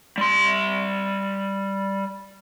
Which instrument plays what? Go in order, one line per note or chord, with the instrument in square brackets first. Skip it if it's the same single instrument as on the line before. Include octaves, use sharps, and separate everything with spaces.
[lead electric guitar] G3 C6